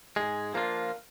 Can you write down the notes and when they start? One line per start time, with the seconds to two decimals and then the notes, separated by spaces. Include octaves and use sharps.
0.16 G#2 G#3 G#4
0.54 F3 A#3 D4 F4